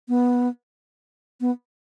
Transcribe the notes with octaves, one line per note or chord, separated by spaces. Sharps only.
B3
B3